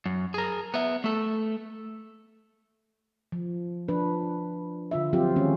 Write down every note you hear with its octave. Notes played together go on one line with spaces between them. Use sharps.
F#2
G#4 A#4
B3 E5
A3 A4
F3
F3 D4 B4
D3 F4 E5
F3 F#3 C4 F4 G4
D#3 G#3 C#4